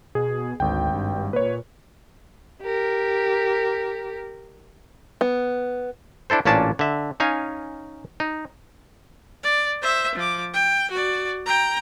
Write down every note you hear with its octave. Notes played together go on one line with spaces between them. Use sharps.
B2 G#4
G#1 D2 G5
G2
A#2 B4 C#5
G4 A#4
B3
D4 E4 A4 C5
A1 A#2 C#4 D4 A5
D3 E5
C#4 D#4 F5 G#5
D#4
D5
C5 E5
F3 D6
G5
F#4 D5
G5 A#5